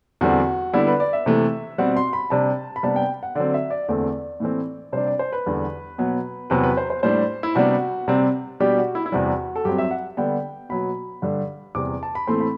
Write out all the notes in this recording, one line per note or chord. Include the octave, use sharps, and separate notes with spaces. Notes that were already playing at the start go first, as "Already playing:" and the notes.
E2 D3 G3 C4 F#4
D3 G3 B3 D4 E4
B4
D5
E5
C3 E3 A3
B2 G3 C4 F#5
C6
B5
C3 G3 D4 A5
B5
C3 G3 B3 D4 A5
G5
F#5
D3 F#3 C4 D5
E5
D5
E2 D3 A3 C4 D5
A2 E3 A3 C4
C3 G3 D4 C5
D5
C5
B4
E2 D3 G3 D4
B2 F#3 B3
E2 C3 F#3 B3 B4
B4
C5
C5
A2 G3 D4 C5
E4
C3 G3 B3 D4 F#4
C3 G3 C4
B2 G3 D4 G4
F#4
E4
E4
E2 C3 G3 F#4
A4
G2 F#3 C4 G4
E5
F#5
D3 G3 B3 D4 G5
B2 F#3 B3 B5
G2 D3 G3 D4
E2 C3 G3 D6
A5
B5
A2 E3 A3 C4 C6
B5